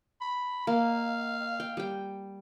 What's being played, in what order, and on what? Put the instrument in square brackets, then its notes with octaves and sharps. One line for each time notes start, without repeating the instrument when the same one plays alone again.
[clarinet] B5
[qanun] A#3 [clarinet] F5
[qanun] G5
G3 G5